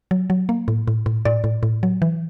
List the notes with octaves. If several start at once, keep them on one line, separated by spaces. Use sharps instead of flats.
F#3
F#3
A#3
A2
A2
A2
A2 D5
A2
A2
F#3
E3